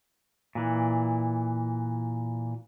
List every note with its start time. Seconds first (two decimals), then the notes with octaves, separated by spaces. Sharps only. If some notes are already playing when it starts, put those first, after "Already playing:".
0.55 A#2 E3